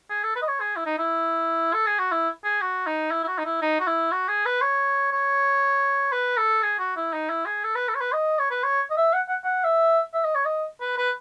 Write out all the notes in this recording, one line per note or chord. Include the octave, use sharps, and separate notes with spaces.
G#4
A4
B4
D#5
C#5
G#4
E4
D#4
E4
A4
G#4
F#4
E4
G#4
F#4
D#4
E4
E4
F#4
D#4
E4
D#4
F#4
E4
F#4
G#4
B4
C#5
C#5
B4
A4
G#4
F#4
E4
D#4
E4
G#4
A4
B4
A4
C#5
B4
D#5
C#5
B4
C#5
D#5
E5
F#5
F#5
F#5
E5
E5
D#5
C#5
D#5
B4
B4